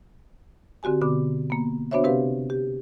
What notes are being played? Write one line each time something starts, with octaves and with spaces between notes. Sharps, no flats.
D3 C4 F#4 G4 G#5
B2 D3 B3 D6
A#3 B3
B3 D4 F#4 C5 C#5 E5
C3 C4 G4 B4 F5
G4